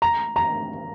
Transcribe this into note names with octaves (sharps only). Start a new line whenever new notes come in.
A#5
A#5